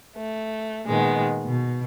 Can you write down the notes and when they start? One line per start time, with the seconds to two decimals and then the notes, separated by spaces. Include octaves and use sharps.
0.17 A3
0.86 A#2 D#3 G#3 B3
1.45 B2